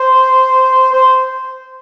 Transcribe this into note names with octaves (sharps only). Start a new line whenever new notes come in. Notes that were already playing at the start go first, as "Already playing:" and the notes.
Already playing: C5
C5